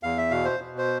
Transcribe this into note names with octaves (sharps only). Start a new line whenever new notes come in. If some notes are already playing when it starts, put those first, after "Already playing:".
E2 F5
E5
B2 F5
C5
B2
C5